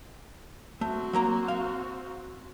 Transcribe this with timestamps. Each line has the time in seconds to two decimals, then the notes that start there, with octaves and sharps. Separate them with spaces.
0.81 A3 C4 F#4
1.13 F#3 A#3 A#5
1.48 F5